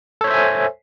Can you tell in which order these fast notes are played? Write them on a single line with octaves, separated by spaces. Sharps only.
A4 C#5 C5 E5 G#5